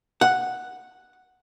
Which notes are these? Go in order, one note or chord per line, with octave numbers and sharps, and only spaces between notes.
F#5